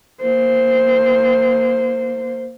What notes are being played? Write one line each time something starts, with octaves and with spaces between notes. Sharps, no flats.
A#3 C5